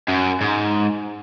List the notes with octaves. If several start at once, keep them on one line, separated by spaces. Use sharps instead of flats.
F#2
G#2